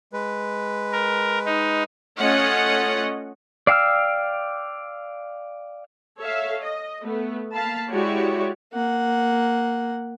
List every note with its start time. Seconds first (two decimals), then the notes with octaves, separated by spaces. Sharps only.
0.13 G#3 B4
0.93 A#4
1.45 D#4
2.19 A3 C#4 F4 C#5 D#5 F#5
3.67 D5 F5 G5 E6 F6
6.19 A4 C#5 E5 F5
6.61 D#5
7.04 A3 B3
7.53 A#3 F5 A5 B5
7.90 G#3 E4 F#4 G4 C#5 D5
8.73 A#3 F#5